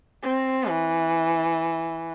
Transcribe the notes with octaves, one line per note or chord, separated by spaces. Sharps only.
C4
E3